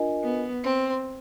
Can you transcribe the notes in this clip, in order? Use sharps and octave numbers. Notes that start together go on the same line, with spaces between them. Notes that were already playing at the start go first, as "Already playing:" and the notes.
Already playing: D4 F4 A#4 D#5 G#5
B3
C4